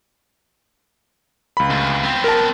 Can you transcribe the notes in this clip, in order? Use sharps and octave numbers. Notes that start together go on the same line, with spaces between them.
C#2 B5
D2
B3 C4
A#4 A5